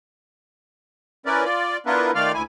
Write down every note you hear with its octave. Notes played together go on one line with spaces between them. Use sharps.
C#4 E4 A#4 B4 D5
F4 D5
B3 D4 E4 F4 A#4 B4
D#3 A3 F4 D5 F5 F6
D2 E4 G#5